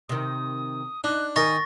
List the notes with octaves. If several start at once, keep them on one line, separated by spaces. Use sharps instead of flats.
C3 D#3 D#6
D4 D#4 F#6
D#3 D#4 A#4 G#5 C#6 A6 A#6